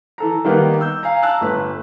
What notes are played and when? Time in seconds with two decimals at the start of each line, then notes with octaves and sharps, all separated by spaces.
0.18 E3 A4 A#5
0.44 D#3 G3 A#3 B3 D#4 B4
0.81 E6 G6
1.03 F5 G#5 A#5
1.22 A5 A#5 E6 F#6
1.41 G1 A3 B4